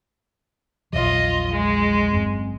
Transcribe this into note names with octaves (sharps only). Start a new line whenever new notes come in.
A#1 E2 F#3 F4 D#5
G#3
G1 F#2 C4